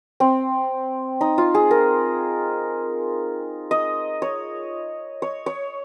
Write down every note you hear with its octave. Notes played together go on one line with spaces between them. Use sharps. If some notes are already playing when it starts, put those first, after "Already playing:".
C4
D#4
F4
G#4
A#4
D#5
C#5
C#5
C#5